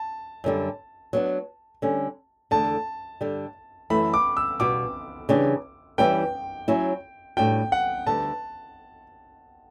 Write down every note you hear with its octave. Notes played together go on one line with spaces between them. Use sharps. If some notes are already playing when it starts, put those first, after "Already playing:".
Already playing: A5
F#2 D3 G3
F#3 B3 D4
D3 G3 C#4
E2 D3 A3 A5
G2 D3 G3 D4
F#2 E3 A3 E4 B5
D6
E6
B2 G3 B3 F#4 D6
C#3 E3 G3 D4 G4
E3 G3 C#4 E4 B4 G5
F#3 C#4 E4
A2 G3 D4 F#4 G5
F#5
D2 D3 G3 B3 A5